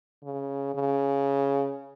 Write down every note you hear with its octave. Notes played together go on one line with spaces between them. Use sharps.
C#3
C#3